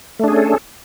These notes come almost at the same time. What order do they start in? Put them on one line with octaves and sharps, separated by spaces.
A3 D4 G#4 C#4 A4